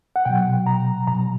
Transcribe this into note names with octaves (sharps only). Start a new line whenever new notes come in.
F#5
B2 F#3 G5
A#5
B2 F#3 A#5